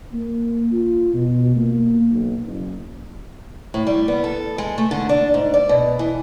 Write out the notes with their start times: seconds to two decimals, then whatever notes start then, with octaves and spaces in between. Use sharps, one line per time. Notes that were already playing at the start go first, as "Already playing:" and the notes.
0.12 A#3
0.73 F4
1.14 B2
1.57 A#3
2.11 B1
2.44 F#1
3.74 A2
3.87 G3
4.08 B3
4.24 A4
4.58 G#3
4.78 A3
4.91 D3
5.09 D4
5.34 G#2
5.54 D5
5.69 B2
5.99 E3